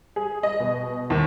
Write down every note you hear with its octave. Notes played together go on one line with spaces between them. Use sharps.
G#4
D#5
B2
D#2